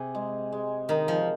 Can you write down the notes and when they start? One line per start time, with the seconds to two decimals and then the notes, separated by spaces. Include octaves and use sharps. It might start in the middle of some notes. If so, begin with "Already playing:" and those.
Already playing: C3 G#4
0.15 G#3
0.52 G#3
0.89 D#3 D#4
1.08 F3